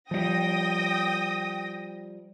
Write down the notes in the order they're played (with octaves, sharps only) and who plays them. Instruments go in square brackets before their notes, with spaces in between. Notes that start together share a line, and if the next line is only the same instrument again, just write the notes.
[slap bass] F3 G3 [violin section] G5 D#6 A#6